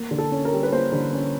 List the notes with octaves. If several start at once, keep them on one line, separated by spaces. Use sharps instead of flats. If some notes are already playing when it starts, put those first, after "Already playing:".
Already playing: A#3
D3
A4
C#4
A#4
G3
B4
A#3 C5
D3
C#4